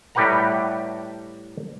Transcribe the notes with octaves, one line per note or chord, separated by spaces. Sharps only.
A2 G3 G4 B4 F#5 A#5